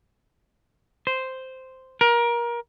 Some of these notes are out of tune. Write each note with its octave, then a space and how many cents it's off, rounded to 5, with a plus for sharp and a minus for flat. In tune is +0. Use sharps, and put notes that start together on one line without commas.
C5 -5
A#4 +25